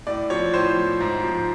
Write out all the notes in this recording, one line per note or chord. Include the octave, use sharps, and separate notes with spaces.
A2 D5
F3 C#5
A2 C5
F3
G#2
F3